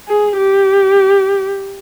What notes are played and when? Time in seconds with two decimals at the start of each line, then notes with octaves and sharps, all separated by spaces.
0.08 G#4
0.37 G4